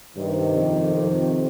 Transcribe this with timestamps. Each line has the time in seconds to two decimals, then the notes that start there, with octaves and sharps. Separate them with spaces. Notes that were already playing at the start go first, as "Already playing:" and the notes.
0.17 G2 C3 D#3
0.56 F2
0.96 F2